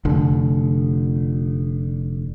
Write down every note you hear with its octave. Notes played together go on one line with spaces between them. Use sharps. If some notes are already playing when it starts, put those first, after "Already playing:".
F1 D3